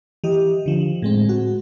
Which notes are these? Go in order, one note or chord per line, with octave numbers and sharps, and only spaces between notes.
E3 G4 D#5
D3 F3
A2 G#3 C4
F#4